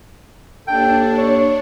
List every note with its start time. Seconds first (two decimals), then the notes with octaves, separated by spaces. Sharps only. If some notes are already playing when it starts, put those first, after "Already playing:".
0.67 D#2 D4 A4 G5
1.17 C#5